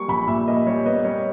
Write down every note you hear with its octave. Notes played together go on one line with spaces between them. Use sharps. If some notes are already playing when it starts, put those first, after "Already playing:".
Already playing: G3 A#3 C#6
A#1 B5
A#2 E5
A#3 D#5
G3 C#5
B3 D#5
G3 C#5